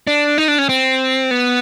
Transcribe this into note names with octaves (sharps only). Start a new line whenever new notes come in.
D4
D#4
D4
C#4
C4
B3